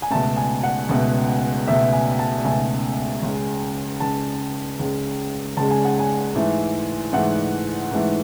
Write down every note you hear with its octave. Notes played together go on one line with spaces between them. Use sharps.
G#5
C#2 B2 A3 A5
G#5
F#5
C#2 B2 A3
C#2 B2 A3 E5
G#5
A5
C#2 B2 A3 G#5
C#2 C#3 G#3
C#2 C#3 G#3 A5
C#2 C#3 G#3
C#2 C#3 G#3 A5
G#5
F#5
G#5
G#2 E3 A3
G#2 E3 A3 F#5
G#2 E3 A3